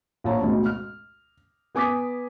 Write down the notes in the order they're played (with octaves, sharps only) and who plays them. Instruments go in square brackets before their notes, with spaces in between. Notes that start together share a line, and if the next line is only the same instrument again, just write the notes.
[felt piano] A#1 C#5 A5 A#5
D2 G#2 B2
F6
B3 G#5 D6 D#6 B6